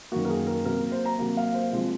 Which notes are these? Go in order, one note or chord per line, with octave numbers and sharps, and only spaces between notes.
F#2 D#3 A#3 F#4
A#4
G#4
A#4
C3 F#3 A#3 A#4
C5
A#5
C3 F#3 A#3
F5
C5
C3 F3 G#3 C4 F4